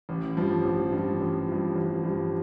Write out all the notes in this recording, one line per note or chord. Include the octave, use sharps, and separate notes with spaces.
A1
G2 F3
A1
G2 F3
A1
G2 F3
A1
G2 F3